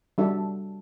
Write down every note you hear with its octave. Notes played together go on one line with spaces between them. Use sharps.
G3 D4 F#4 A4 E5